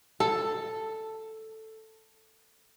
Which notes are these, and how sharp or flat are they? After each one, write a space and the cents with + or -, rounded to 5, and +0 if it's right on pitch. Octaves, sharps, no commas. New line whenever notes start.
A4 +5